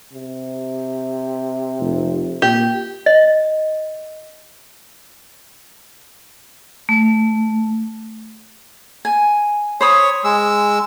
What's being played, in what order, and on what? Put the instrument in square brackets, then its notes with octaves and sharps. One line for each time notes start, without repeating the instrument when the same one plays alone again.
[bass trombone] C3
[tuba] F1
[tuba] A#2 [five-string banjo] G4
[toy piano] D#5
[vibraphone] A3
[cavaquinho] G#5
[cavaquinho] C5 B5 D#6 [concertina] C#5
[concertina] G#3 E6